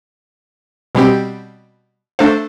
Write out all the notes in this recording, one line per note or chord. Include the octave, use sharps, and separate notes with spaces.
B2 G3 C4 G4
A3 D4 A4 C5 F5